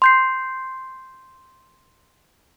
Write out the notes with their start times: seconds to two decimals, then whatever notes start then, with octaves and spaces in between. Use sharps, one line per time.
0.02 C6 G6 C7